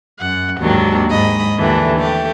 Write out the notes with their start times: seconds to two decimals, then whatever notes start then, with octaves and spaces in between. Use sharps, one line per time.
0.21 F#2 F#5
0.58 D#2 G#2 D#3 F#3 A#3 D4
1.08 G#2 D#5 B5
1.58 D#2 D3 E3 A3 D4
1.96 A3 G4